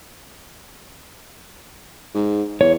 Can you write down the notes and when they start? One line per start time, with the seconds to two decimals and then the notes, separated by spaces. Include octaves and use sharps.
2.14 G#2
2.61 E2 C#5